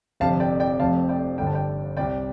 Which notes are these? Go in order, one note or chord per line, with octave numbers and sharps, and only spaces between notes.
G1 F2 C3 F5 A5
D5 G5
D5 G5
F1 F2 C3 F5 A5
D5 G5
G1 G2 D3 G5
A5
D5 G5
C2 C3 D5 G5